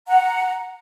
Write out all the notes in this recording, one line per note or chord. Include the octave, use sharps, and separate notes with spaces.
F#5 A#5